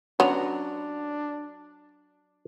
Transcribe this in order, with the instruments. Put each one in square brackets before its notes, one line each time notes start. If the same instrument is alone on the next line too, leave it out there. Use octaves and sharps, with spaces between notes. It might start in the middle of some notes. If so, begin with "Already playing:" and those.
[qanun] F#3 A#5 [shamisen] B3 [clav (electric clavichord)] C#4 [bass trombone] D4